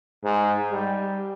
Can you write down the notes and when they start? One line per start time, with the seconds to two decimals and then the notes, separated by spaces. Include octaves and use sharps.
0.24 G#2
0.71 G3